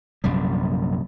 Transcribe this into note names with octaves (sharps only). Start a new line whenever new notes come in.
A#1 F#2 C3 G3